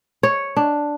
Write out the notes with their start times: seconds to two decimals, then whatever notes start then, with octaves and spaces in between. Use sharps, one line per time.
0.23 C#5
0.57 D4